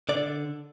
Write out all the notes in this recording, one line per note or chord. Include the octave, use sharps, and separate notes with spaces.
D3 D5